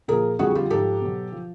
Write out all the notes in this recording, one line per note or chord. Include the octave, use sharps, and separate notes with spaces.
A#2 F3 G#4 A#4
F2 D3 G3 F#4 G#4
F4 G4
G#2 F3 G4 A4
B2 F#3
F3